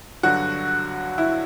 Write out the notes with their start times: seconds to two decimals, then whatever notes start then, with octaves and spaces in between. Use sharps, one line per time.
0.23 G2 D3 F#3 F#4
1.18 E4